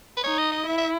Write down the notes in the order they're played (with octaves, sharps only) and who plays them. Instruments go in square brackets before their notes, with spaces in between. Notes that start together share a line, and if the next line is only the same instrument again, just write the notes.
[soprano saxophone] B4
[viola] D#4 [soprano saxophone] C#5
[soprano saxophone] D#5
D#5
[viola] E4 [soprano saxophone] E5
[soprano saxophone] E5